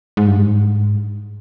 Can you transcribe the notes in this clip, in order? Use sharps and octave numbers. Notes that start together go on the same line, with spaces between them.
G#2
G2
G#2